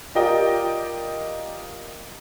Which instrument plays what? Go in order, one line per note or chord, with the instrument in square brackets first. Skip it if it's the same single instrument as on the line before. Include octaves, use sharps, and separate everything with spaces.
[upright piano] F4 G4 A#4 D5 D#5 G5